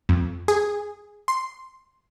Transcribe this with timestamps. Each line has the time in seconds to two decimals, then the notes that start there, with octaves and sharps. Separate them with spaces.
0.09 F2
0.48 G#4
1.28 C6